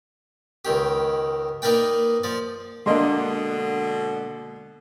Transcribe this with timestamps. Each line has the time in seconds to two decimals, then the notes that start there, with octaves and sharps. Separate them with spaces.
0.65 C#2 D#3 G4
1.62 A#3 D#4 A#4 B4 D5 G5
2.23 F3 D5
2.86 B2 D3 G#3 A#3 D4 D#5 C6